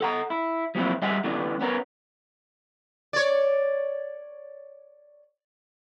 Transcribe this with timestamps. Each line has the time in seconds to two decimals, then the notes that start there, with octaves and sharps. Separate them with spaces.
0.01 A4 F#5 A#5
0.30 E4
0.75 F3 F#3 A#3 C4 E4
1.02 G3 G#4 D#5 E5 F#5 G#5
1.24 E3 A3 B3 C#4 D4
1.61 B3 C#4 A#4
3.13 C#5 D5